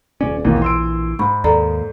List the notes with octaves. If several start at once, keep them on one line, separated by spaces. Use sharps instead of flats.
D#1 C#4 D5
A#1 D#2 B2 D#3 E3
C6 E6 D7
G#2 B5 C#6
D#2 A4 D5 A#5